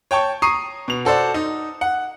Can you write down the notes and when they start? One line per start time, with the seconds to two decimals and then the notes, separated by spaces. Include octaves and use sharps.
0.11 C#5 G5 A5 C#6
0.42 A#5 C#6 D#6 C7 D#7
0.88 B2 F7
1.05 F#4 A4 C5 D5
1.34 D#4
1.81 F#5